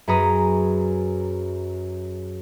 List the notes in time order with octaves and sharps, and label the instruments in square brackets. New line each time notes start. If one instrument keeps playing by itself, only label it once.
[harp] F#2 G#4 B4 C#5 A#5 D#6